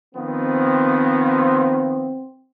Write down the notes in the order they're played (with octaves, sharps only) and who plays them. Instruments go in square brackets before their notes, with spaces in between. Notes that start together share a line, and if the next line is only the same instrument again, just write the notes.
[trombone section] D#3 F3 B3 [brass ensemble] C4